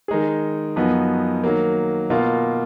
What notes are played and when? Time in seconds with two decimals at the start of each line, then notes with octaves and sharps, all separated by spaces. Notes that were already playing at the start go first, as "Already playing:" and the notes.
0.08 D#3 G#3 D#4 G#4
0.76 F#2 F3 B3 D#4 F#4
1.44 D#3 F#3 A#3
2.10 B2 A#3 F4